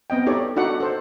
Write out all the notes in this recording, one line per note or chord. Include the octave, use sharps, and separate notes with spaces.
B3 C4 D#5 G5
D#4 G4 A4 C#5 D5
D4 D#4 F#4 A4 D5 F#5
A4 C5